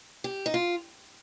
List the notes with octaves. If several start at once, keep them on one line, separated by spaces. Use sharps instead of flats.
G4
D#4
F4